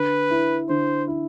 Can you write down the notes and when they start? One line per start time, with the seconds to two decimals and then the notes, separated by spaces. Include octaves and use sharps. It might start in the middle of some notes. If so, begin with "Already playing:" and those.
Already playing: D3 B4
0.30 E4
0.69 D3 C5
1.08 E4